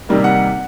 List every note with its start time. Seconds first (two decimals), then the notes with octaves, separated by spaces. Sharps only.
0.09 C3 D#3 G3 A#3
0.24 F#5